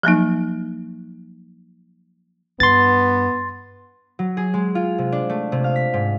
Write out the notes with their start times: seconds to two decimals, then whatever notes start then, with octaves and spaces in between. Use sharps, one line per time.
0.03 F3 F#3 A#3 D#4
2.60 G2 B3 C6 A6
4.19 F#3
4.37 G#4
4.54 G#3
4.75 F4
4.98 C3
5.12 D4
5.30 A3
5.52 C3
5.64 F5
5.76 B6
5.94 G#2